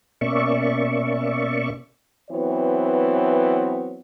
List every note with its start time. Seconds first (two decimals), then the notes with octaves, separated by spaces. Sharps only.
0.21 B2 A#3 C#4 D5 E5 C#6
2.30 E3 F#3 B3 C4 C#5